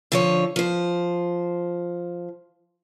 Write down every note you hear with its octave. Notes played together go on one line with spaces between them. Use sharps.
D3 F3 C#5
F3 C5